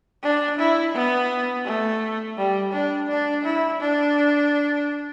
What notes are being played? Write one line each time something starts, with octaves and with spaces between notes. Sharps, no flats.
D4
E4
B3
A3
G3
D4
D4
E4
D4